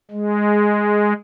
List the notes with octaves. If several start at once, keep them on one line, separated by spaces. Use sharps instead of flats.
G#3